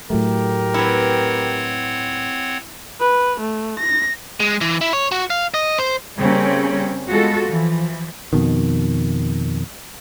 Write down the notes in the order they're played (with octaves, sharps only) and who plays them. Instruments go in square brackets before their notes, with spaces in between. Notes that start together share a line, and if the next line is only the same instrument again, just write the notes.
[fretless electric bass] A2 F#3 A3 [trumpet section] G4 A#4
[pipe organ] C4 C#5 F#5 [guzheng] E4 B4
[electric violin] B4
A3
A#6
[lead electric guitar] G#3
E3
E4
C#5
F#4
F5
D#5
C5
[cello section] C#3 G3 A#3 C4 C#4
G#3 B3 F4 F#4 A4
E3 F3
[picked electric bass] F2 B2 D#3